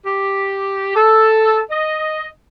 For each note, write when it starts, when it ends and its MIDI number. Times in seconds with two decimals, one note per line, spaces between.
0.06 0.93 67
0.95 1.59 69
1.71 2.26 75